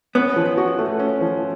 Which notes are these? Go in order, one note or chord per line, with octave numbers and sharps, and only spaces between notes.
B3 C#4
F3
F#4
A3
C#4
F3